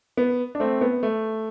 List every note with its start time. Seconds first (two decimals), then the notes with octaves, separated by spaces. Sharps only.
0.17 B3
0.55 D4
0.60 A3 C4
0.81 B3
1.03 A3